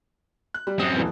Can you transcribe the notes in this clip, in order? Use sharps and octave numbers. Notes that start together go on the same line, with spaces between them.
F#6
G3
F#2 C4 D#6
D#1 E3